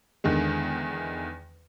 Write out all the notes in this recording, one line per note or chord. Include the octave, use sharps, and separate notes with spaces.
E2 D3 D#3 G#3